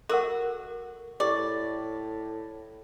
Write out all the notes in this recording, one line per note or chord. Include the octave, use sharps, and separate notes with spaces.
F#4 A4 A#4 F#5
A2 G4 D5